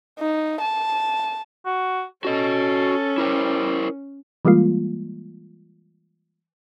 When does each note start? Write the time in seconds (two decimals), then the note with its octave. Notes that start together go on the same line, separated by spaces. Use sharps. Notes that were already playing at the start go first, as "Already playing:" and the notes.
0.19 D#4
0.61 A5
1.65 F#4
2.25 C#4 F#4 A4 D#5
3.18 G3 E4 A#4 C5
4.45 E3 G3 G#3 A#3 F4